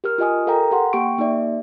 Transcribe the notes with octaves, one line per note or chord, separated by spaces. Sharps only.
G4 A#4 F6
F4 G4 D#5 G#5 D#6
A4 A#4 F5 G5 A#5
G4 F5 F#5 C6
A#3 G4 G5 C#6 D7
A#3 D#4 G4 D5 E5